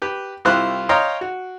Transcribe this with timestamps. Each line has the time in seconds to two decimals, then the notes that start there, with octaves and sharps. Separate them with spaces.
0.02 G4 B4
0.45 C2 E4 F4 G4 C5 F#6
0.89 C#5 D#5 F5 G5 A#5 C6
1.21 F#4